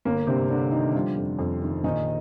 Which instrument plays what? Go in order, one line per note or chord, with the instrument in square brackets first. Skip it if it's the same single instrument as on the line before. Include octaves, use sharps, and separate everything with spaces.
[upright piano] G1 A#3
G2 C3 C4
D3 D4
D3 D#3 D#4
F3 G3 F4
F2
F2
D#3
A#1 D#3 D#4